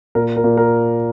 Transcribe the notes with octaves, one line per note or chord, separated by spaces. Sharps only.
A#2 A#4
A#4
A#2
A#4